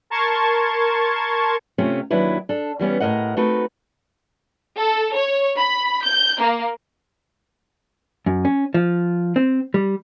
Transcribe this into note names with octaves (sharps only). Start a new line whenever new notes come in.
A#4 A5 C6 C#6 G#6
C3 A3 C4 C#4 F4
D#2 F#3 D4 E4 B4
D4 A4
E3 G3 B3 C#4
A2 A#3 A#4 D#5 F#5
A3 C4 D#4 F#4 B4
A4
C#5
B5
G6
A#3
F#2
C#4
F3
C4
G3